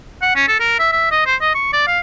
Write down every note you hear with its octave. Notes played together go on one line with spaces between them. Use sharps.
F#5
C#4
A4
A#4
E5
E5
D#5
C5
D#5
C#6
D5
F5